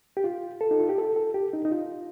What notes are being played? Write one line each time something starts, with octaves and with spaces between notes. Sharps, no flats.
G4
F4
A4
D#4
F4
G4
A4
A4
G4
D#4
D#4
F4